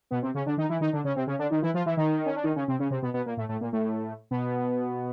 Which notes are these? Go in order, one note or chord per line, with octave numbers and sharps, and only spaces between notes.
B2 B3
C3 C4
C#3 C#4
D3 D4
D#3 D#4
E3 E4
D#3 D#4
D3 D4
C#3 C#4
C3 C4
C#3 C#4
D3 D4
D#3 D#4
E3 E4
F3 F4
E3 E4
D#3 D#4
C#4
D4
D#3 D#4
C#3 C#4
C3 C4
C#3 C#4
C3 C4
B2 B3
B2 B3
A#2 A#3
A2 A3
A2 A3
A#2 A#3
A2 A3
B2 B3